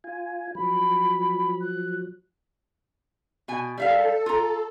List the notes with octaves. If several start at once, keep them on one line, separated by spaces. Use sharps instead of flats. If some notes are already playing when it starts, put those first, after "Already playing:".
F4 G#5
F3 F#3 B5
F#6
B2 G#5
G3 A4 E5 F5
F4 A#5